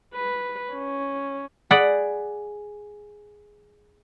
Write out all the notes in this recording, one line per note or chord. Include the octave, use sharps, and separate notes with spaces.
B4
C#4
G#4 D5 F#5 B5